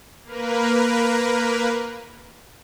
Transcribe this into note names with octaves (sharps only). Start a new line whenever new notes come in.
A#3 A#4 B4